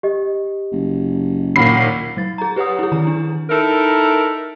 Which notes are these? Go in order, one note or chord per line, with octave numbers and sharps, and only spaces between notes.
G4 D#5
F#1
D#2 A#2 F#5 B5 C7
F#3 A6
G#4 A#5
G4 B4 C#5 F#5 D#6
E4 G#4
D#3 A#5
D4
D#4 E4 A4 A#4